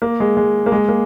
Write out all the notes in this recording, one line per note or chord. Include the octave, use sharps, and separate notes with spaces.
A#3
G#3
G#3
A#3
G#3
A#3